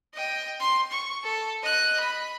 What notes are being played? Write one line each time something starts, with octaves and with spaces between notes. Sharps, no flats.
D#5 G5
C6
C#6
A4
D#5 F#6
B5